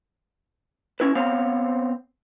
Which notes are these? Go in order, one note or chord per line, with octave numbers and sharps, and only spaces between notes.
C#4 E4 B4
B3 C4 C5 C#5 F5